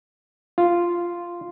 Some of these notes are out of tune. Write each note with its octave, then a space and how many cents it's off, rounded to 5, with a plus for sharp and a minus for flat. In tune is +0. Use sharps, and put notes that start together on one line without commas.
F4 -5